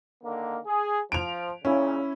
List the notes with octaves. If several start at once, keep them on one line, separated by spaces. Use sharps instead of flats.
D3 D#3 A#3
G#4
F3 D7 F7
A#2 C#3 C#4 E4